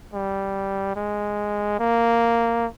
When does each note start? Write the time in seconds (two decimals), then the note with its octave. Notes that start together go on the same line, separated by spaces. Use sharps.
0.13 G3
0.96 G#3
1.79 A#3